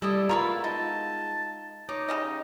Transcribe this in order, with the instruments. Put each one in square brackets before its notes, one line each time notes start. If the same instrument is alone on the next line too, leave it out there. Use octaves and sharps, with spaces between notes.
[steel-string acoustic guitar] G3 [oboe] E4 [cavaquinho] A4 D5 D#5
[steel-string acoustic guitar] G#3 B3 A#4 [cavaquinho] F4 F5 B5 [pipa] A#5 C#6
[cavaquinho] D#4 F4 [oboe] A5
[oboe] D#4 [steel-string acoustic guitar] C#5 [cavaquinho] D6
[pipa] C#3 G4 D#5